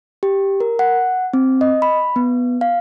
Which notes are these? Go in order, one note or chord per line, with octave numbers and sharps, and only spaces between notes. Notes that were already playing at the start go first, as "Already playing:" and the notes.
G4
A#4
F#5
C4
D#5
B5
B3
F5